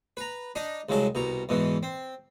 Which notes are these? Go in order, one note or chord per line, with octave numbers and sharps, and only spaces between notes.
B4 A#5
D4 D#4 D#5
C2 C#3 F#3 G#3 A5
C2 B2 A#5
E2 G#2 B2 E3
C4